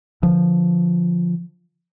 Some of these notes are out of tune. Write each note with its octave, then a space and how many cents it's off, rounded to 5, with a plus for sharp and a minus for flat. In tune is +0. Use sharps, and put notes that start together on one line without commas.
D3 +0 F3 +0